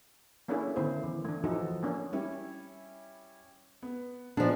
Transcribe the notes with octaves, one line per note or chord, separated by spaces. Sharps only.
A#3 C#4 D4 E4 G#4 A4
D3 D#3 A3 B3 E4 C5
E3
A3 D4
E3 F3 D#4 F#4 A4
A#3 C#4 D4
G3 C#4 E4
B3
F3 B3 D4 D#4 G#4